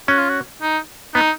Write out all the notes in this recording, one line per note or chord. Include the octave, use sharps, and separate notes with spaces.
C#4 F#4
F4
F#4
D#4
B3 D#4